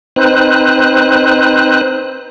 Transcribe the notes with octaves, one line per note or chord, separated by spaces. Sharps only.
C4 D#4 B4 C5 F#6